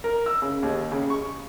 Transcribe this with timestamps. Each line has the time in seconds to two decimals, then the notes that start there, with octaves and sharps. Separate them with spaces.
0.04 A#4
0.26 E6
0.42 C#3
0.63 D#2
0.92 C#3
1.10 C#6